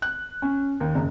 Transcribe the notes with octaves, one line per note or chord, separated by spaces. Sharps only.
F#6
C#4
D#2
F#1